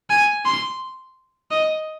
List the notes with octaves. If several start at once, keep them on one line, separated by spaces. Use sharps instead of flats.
G#5
C6
D#5